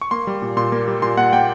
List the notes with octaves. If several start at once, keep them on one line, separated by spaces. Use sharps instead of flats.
C#6
A#3 C6
G3
A#2
A#2 C6
A#3
G3
A#2 C6
A#2 F#5
A#3 G5